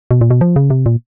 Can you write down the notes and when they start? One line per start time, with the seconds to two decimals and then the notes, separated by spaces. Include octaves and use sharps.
0.11 B2
0.21 A#2
0.30 B2
0.41 F3
0.56 C#3
0.70 C3
0.86 A#2